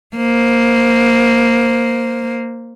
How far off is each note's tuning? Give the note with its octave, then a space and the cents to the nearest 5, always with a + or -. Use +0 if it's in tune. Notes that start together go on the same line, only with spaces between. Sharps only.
A#3 +0 C5 +0